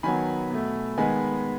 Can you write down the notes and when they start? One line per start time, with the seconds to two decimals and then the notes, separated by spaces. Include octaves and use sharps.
0.03 D#3 F#3 B3 G#5 B5
0.51 B2 A3
0.98 D#3 G#3 B3 G#5 B5